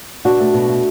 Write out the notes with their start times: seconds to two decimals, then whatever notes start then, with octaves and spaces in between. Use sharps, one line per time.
0.25 B2 D4 F#4
0.40 A3
0.54 B2
0.70 A3